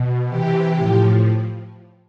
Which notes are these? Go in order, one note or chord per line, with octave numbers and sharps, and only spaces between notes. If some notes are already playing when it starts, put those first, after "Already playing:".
Already playing: B2
C3 E3 G4
A2 F3